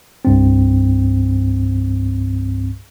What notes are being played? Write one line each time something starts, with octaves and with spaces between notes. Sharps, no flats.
C2 G2 C4